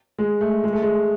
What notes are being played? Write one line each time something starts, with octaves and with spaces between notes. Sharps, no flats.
G#3
A3
G#3
A3
G#3